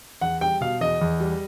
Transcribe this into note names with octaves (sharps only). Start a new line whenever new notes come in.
E2 F#5
G3 G5
B2 F5
E2 D#5
E2
G3